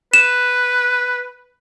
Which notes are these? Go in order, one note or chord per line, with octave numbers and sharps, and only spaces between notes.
B4 E7